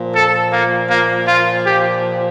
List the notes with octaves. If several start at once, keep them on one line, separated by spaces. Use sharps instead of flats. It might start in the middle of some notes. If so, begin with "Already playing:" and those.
Already playing: A#2 F3
A4
A#3
A#3
F4
G4